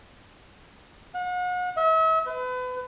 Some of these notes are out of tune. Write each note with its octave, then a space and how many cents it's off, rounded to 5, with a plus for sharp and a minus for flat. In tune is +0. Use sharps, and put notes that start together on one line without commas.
F#5 -40
E5 -40
B4 +30